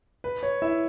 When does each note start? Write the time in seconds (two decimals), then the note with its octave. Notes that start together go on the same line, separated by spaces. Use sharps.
0.24 B4
0.43 C#5
0.62 E4 E5